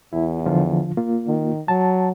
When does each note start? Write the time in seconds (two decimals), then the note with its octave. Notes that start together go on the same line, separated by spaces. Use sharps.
0.13 E2 E4
0.46 D3 F3 F4
0.97 A#3 F4
1.27 D#3
1.68 F#3 A5